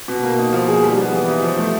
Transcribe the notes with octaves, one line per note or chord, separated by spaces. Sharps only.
B2
A#3
D#4
F3
G#4
G3
B3
E3
D#4
F3
A3